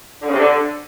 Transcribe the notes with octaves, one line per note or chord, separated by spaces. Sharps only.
D3
C#3
C3
D3